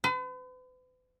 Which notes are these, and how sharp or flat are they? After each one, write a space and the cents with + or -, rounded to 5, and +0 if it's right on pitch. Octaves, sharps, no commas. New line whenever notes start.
B4 +45